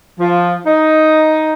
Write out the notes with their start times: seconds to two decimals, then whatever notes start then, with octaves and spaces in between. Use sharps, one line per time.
0.19 F3
0.65 D#4